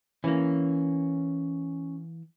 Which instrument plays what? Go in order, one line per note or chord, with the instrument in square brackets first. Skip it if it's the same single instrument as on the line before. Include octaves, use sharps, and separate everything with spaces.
[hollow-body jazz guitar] E3 A#3 [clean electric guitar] C#4